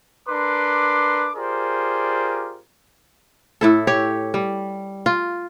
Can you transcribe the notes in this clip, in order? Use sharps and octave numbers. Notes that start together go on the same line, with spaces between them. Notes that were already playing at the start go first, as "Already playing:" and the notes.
D4 A#4 B4 C6 D6
F4 G4 G#4 A#4 C5 D5
A2 E4 A4
G4 C#5
G3
F4